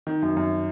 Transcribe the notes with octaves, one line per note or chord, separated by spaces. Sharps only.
D#3
F#2
F#2